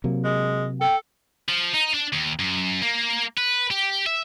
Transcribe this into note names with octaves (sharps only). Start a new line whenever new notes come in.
C3 F#3 A#3
G#3
A4 G5
F3
D#4
D4
D#2
F#2
A#3
B4
G4
E5